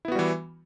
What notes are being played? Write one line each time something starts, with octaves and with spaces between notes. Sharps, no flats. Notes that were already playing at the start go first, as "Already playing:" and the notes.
E3 G3 B3 E4 F#4